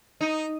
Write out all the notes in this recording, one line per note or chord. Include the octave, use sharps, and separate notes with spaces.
D#4